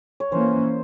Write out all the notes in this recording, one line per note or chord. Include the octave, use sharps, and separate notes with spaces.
C#5
E3 A#3 C#4 C5